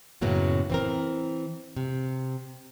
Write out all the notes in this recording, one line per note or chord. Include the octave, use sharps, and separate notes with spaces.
F#2 A2 C#3 F#3 A#3 B3
E3 C4 A#4
C3